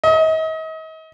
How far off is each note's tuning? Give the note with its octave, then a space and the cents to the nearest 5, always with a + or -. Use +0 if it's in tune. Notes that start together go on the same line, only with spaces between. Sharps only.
D#5 +40